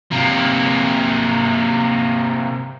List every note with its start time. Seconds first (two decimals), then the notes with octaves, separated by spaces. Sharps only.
0.12 C3 A#3